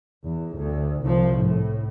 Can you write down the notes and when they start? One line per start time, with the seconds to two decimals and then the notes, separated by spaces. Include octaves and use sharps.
0.24 E2
0.56 D2
1.01 C2 F3
1.38 A2